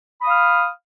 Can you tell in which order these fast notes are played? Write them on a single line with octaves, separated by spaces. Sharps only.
B5 D#6 F5 F6